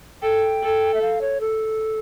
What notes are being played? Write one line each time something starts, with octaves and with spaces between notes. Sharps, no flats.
A4 G5
A4
E5
F5
C#5
A4